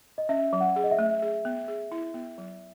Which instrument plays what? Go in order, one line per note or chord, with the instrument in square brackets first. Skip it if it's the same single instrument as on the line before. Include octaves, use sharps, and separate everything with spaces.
[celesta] D#5
[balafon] C#4 [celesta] E5
[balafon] F#3
[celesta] F#5
[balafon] G#4
[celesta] D#5
E5
[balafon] A3
G#4
B3
G#4
E4
B3
F#3